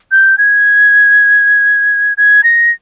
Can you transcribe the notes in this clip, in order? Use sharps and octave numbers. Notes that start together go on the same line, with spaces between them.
G6
G#6
G#6
A#6